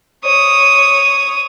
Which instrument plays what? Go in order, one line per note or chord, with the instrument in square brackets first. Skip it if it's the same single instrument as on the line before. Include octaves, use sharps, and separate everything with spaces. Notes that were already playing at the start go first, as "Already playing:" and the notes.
[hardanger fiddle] C#5 D#6